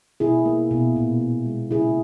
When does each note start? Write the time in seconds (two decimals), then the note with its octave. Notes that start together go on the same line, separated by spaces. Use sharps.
0.20 B2 E4 G#4
0.45 A#3
0.71 B2
0.96 A#2
1.21 A#2
1.46 G#3
1.71 C#3 E4 G#4